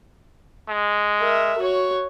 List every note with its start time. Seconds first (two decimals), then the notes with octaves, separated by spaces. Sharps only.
0.69 G#3
1.20 A#4 E5
1.58 F#4 C#5